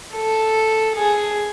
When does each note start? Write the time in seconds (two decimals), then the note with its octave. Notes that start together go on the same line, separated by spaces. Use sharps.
0.13 A4
0.96 G#4